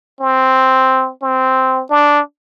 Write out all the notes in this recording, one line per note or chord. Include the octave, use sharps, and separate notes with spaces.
C4
C4
D4